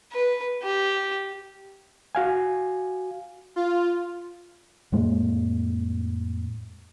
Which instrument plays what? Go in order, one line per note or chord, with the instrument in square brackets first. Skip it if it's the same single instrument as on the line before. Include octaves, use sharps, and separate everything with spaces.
[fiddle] B4
G4
[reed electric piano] F#4 F5 G#5
[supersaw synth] F4
[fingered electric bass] F2 A2 G#3 A#3